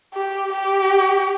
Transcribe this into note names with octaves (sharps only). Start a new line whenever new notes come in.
G4
G4